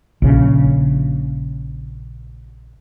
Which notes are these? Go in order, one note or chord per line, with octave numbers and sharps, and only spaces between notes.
A#1 C#3